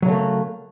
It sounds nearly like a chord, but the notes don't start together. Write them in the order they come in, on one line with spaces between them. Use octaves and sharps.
F#3 C#3 A3 A#3